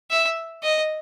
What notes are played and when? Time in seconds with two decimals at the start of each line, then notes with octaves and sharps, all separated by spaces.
0.10 E5
0.63 D#5